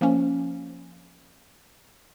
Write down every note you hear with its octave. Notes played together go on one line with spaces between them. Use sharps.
F3 A#3 C#4